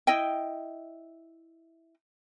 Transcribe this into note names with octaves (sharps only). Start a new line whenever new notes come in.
E4 D#5 G5